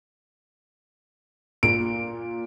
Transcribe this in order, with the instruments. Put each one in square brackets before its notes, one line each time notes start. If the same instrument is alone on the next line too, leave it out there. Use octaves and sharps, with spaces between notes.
[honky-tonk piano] A#2 [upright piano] D7